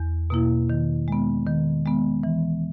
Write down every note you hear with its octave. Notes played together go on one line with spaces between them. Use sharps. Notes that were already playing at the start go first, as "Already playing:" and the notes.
Already playing: E2
B2 A#3 E4
D#3
G#3 B3
D#3
G#3 B3
E3